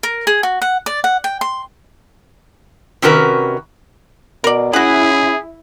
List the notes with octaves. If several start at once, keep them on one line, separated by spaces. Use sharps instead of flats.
A#4
G#4
F#4
F#5
D5
F#5
G5
C6
C3 D#3 C#4 F#4 A#4 B4
B2 A#4 D5
C#4 E4 F#4 G#4 F#5